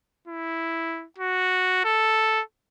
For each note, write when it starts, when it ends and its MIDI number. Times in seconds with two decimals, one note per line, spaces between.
0.28 1.06 64
1.18 1.84 66
1.85 2.42 69